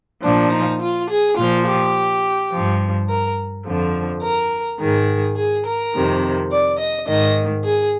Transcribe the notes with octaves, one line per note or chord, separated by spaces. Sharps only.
A#2 F3 D4
D#4
F4
G#4
A#2 F3 F4
G4
G2 F3
A#4
F2 D3 F3
A#4
G#2 D#3 G#4
G#4
A#4
F2 C3 D#3
D5
D#5
G#2 D#3 D#5
G#4